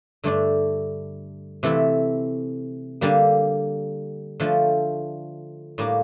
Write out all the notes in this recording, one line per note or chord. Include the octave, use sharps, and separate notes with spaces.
G2 D3 A3 D4
C3 E3 A3 E4
D3 G3 A#3
D3 F3 A3
A2 G3 A#3 D4